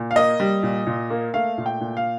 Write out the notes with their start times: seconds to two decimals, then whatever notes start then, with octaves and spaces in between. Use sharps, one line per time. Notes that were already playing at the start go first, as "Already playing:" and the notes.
Already playing: A#2
0.11 F5
0.16 A#3 D#5
0.40 G3
0.63 A#2
0.87 A#2
1.10 A#3
1.34 A3 F5
1.58 A#2
1.66 G5
1.81 A#2
1.97 F5